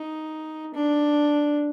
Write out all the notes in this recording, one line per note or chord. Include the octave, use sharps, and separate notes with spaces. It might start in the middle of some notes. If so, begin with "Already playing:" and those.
Already playing: D#4
D4